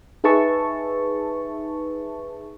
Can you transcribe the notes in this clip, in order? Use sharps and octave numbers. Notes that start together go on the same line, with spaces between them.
D#4 G#4 B4 E5 A5 C#6